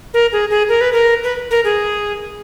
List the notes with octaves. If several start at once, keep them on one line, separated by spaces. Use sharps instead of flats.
A#4
G#4
G#4
A#4
B4
A#4
B4
A#4
G#4